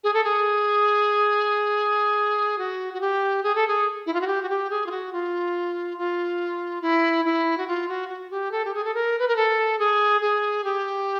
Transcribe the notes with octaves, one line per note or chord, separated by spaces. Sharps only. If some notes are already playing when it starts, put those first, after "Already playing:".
G#4
A4
G#4
F#4
F#4
G4
G#4
A4
G#4
E4
F4
F#4
G4
F#4
G4
G#4
F4
F#4
F4
F4
E4
E4
F#4
F4
F#4
F#4
G4
A4
G4
G#4
A4
A#4
B4
A#4
A4
G#4
G#4
G4